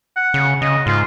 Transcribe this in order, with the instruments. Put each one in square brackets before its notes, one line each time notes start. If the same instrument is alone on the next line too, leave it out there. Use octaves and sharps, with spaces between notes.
[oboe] F#5
[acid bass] C#3
[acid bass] C#3 [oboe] D#5
[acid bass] G#2 [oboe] F4